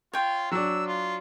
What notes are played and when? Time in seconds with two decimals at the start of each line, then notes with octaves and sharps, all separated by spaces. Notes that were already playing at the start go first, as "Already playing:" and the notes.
0.13 F4 C#5 G5
0.52 F#3 D4 E6
0.87 F4